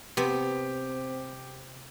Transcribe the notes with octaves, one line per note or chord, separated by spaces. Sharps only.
C3 B3 C4 G4